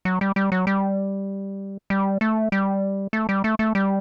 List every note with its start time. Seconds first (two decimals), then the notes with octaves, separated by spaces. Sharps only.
0.05 F#3
0.21 G3
0.36 G3
0.52 F#3
0.67 G3
1.90 G3
2.21 A3
2.52 G3
3.13 A3
3.29 G3
3.44 A3
3.59 A3
3.75 G3